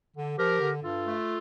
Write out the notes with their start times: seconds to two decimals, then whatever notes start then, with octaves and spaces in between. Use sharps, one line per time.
0.16 D3
0.38 F3 G4 A#4
0.60 D3
0.82 G2 F4 A4
1.05 A3